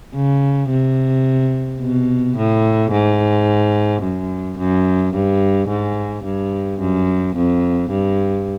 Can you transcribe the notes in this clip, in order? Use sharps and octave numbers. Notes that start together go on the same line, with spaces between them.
C#3
C3
B2
A2
G#2
F#2
F#2
G2
G#2
G2
F#2
F2
G2